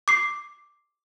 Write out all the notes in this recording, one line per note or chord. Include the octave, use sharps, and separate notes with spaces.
D6 C7